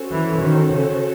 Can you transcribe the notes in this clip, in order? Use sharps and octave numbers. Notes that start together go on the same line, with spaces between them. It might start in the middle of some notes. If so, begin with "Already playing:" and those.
Already playing: C#4 F#4 A4 C5
E3
D#3
C#3